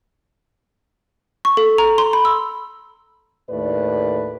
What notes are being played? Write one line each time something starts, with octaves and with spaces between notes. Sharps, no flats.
C#6
A4
A#5
C6
B5
E6
D#2 A2 B4 D5